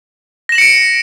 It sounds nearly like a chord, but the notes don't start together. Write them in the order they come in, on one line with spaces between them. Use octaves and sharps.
A#6 E7 F#7 C#7 D7